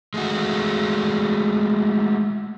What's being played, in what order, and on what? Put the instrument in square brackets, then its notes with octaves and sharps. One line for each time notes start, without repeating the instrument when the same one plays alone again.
[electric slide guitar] G#3 A3 F#4